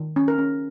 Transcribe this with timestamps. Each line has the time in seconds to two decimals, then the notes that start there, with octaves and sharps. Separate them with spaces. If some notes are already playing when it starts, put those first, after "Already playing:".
Already playing: D#3
0.16 C#4
0.28 A#4
0.38 C#4